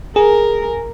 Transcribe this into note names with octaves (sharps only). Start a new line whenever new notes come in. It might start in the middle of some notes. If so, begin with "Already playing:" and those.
G#4 A#4